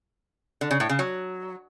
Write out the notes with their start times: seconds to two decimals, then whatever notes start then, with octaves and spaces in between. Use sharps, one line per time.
0.61 D3
0.71 C#3
0.80 A2
0.89 C#3
0.99 F#3